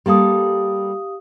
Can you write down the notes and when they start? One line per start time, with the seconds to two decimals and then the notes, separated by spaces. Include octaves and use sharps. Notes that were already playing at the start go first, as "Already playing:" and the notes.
0.06 G3 A#3 G4 A4 F5 D#6